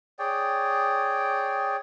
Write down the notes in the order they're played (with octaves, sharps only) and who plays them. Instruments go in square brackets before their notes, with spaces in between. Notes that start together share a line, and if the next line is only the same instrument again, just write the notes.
[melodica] G#4 C#5 D5 G5